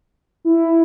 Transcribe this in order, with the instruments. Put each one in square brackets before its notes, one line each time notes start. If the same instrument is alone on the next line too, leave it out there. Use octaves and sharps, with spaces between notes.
[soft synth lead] E4